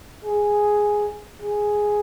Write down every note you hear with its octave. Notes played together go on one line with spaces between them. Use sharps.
G#4
G#4